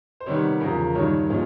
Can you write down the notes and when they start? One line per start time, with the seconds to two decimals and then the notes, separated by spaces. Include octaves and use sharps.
0.20 C5
0.26 C3 D#3 G3 B3 C#5
0.61 E2 C#3 F3 A#4
0.95 G2 D#3 F#3 C#5
1.29 A#2 F3 G#3 C#4